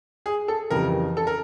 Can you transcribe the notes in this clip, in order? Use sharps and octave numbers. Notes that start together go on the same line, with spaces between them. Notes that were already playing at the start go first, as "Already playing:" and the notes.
G#4
A4
F2 C#3 E3 G3 A#4
A4
A#4